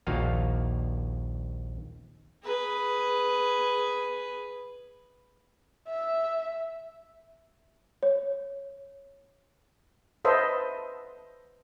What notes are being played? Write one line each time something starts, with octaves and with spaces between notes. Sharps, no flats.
A#1 D#2 A#3 F4 F#4 F5
G#4 B4
E5
C#5
A4 B4 C5 D#5 E5